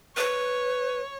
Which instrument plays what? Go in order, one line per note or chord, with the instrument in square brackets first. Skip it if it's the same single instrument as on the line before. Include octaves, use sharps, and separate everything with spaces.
[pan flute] B4 [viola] C#5